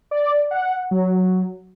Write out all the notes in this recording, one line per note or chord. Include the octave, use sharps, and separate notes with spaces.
D5
F#5
F#3